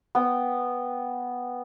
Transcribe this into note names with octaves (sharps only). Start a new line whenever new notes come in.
B3 G5